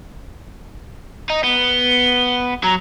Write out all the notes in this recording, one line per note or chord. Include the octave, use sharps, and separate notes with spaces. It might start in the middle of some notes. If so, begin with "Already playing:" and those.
D#4
B3 G7
F#3 A#5